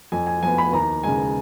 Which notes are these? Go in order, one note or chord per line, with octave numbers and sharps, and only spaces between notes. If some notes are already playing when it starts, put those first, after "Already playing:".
F2 G#5
G#5
F3 B3 G#5
B5
D#2 A#5
C#3 G#3 G#5